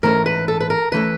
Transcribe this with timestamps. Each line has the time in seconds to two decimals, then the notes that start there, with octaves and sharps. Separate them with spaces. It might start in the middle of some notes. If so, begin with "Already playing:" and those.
0.03 G#2 E3 A3 C#4 E4 A#4
0.26 B4
0.48 A4
0.60 B4
0.70 A#4
0.92 E3 A3 C#4 E4 B4